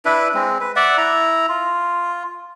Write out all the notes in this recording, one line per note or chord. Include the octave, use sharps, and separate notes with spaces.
D4 E4 B4
G#3 C4
B4
D5 E5 F#5
E4 A#5
F4